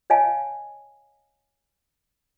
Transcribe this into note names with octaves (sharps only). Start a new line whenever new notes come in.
C#5 D#5 F5 G#5 A5